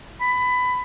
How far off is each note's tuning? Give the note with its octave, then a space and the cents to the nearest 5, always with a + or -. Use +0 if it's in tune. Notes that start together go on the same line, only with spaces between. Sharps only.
B5 +20